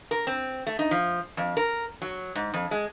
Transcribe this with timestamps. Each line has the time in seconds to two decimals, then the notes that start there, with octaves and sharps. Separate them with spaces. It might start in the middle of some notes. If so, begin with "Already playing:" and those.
0.11 A#4
0.27 C4
0.67 A3
0.79 D#4
0.91 F3
1.37 F2
1.57 A#4
2.02 F#3
2.35 G#2
2.54 F2
2.71 G#3